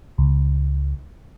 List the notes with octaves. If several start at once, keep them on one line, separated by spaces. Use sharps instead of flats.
C#2